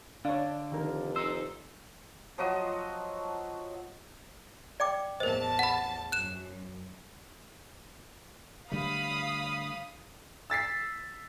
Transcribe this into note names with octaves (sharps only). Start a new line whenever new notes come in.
D3 D4 C#5 F5
F1 D#3 A#4
D#4 C5 E6
F3 F#3 F#4 D#5
D5 G5 D6
A1 E2 A#4 C5 D#5 A5
F#5 B5
F#2 F#6 E7
D3 G3 A3 F5 B5 D#6
E6 A6 B6 C7